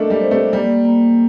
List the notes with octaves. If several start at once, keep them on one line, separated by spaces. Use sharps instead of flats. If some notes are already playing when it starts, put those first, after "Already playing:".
Already playing: A3 A#3 D4 A4 D#5
G3
C5
A3
G3 A#3
A#3